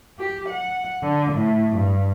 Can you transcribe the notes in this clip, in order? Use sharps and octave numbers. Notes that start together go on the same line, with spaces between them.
G4
F#5
D3
A2
G2